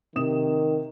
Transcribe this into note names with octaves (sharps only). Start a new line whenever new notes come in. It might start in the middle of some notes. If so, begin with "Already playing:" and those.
C3 D#3 D#6 E7